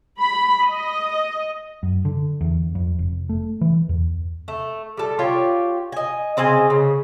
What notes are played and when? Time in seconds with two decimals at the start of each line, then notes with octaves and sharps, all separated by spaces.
0.21 B5
0.64 D#5
1.83 F#2
2.05 D3
2.41 E2
2.75 F2
2.99 F1
3.29 A3
3.61 E3
3.89 E2
4.48 A3
4.97 G3 A4
5.19 F4 G4 C#5
5.92 D#5 G#5
6.37 C#3 C4 D#5 G#5
6.70 C#3